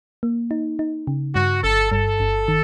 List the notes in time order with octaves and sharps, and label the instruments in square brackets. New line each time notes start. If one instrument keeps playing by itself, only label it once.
[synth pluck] A#3
D#4
D#4
C#3
[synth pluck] G2 [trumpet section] F#4
[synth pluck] G1 [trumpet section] A4
[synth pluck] G2 [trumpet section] A4
[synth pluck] G1
D#3